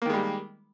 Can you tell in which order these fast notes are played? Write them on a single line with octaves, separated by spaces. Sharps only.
A#3 D#3 G#3 G3